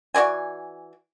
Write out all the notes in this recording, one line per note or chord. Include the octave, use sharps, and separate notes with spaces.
E3 F#4 D5 G#5